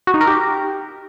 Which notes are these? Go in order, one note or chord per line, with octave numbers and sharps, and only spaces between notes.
F#4
D#4
A#4
G4